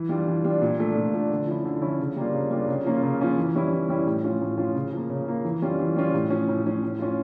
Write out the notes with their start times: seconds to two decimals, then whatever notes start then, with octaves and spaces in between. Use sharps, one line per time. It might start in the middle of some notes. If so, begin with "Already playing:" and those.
Already playing: E3
0.09 G3 D4 F4
0.27 E3
0.45 G3 D4 F4
0.61 A#2
0.79 F3 A3 D4
0.96 A#2
1.13 F3 A3 D4
1.30 D3
1.47 F3 C#4 E4
1.65 D3
1.82 F3 C#4 E4
1.99 C#3
2.16 G3 A#3 D4 F4
2.33 C#3
2.50 G3 A#3 D4 F4
2.68 C#3
2.85 F3 A#3 C#4 F4
3.03 C#3
3.19 F3 A#3 C#4 F4
3.38 E3
3.55 G3 C#4 E4
3.72 E3
3.89 G3 C#4 E4
4.06 A2
4.24 F3 C#4 F4
4.41 A2
4.58 F3 C#4 F4
4.75 C#3
4.93 F3 A#3
5.10 C#3
5.27 F3 A#3
5.44 E3
5.62 G3 C#4 F4
5.79 E3
5.96 G3 C#4 F4
6.13 A2
6.30 F3 C#4
6.48 A2
6.64 F3 C#4
6.83 A2
6.99 F3 C#4 F4